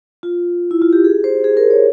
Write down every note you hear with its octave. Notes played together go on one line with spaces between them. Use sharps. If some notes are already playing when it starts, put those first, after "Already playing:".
F4
E4
F4
G4
G#4
C5
G#4
A#4
C#5